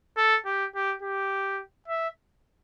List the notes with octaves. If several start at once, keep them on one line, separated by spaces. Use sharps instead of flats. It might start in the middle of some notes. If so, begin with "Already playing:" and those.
A4
G4
G4
G4
E5